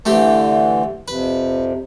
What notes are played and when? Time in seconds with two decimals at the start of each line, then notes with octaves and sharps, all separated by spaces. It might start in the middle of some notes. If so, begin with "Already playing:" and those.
0.06 D3 E3 A3 C4 G4
1.08 F2 C3 B4